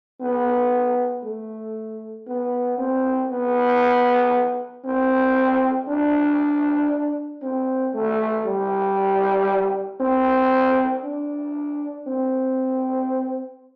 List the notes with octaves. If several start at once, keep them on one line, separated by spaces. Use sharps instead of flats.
B3
A3
B3
C4
B3
C4
D4
C4
A3
G3
C4
D4
C4